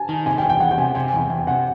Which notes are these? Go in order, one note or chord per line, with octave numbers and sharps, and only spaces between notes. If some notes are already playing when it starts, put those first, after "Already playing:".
Already playing: G#5 A5
D#3
C3 G#5
G5
E2
G5
E2 F#5
G5
C3 G#5
C3 G#5
E2
E2 G5
C3 F#5